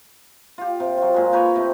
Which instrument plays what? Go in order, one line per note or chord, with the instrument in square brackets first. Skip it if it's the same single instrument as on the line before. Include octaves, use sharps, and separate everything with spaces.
[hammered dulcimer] F4 G4
C3
F#3 F4
A#2 G#3
D#4 A#4 B4 C#5
C3 A3